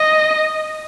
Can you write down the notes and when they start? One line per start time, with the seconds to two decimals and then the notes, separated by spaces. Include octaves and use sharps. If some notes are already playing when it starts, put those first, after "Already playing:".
Already playing: D#5